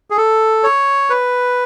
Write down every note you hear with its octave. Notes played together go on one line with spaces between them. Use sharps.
G#4
A4
C#5
B4